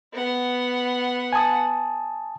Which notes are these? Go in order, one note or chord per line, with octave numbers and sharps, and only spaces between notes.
B3 F#5
G#5 A5 D#6